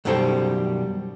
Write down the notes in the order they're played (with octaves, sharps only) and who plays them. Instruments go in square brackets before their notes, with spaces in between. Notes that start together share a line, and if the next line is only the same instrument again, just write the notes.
[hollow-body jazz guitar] F#2 B2 D#3 G3 A4 C5